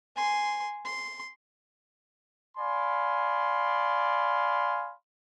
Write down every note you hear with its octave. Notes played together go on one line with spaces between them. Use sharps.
G#5 C6
C6
D5 F5 G#5 B5 C6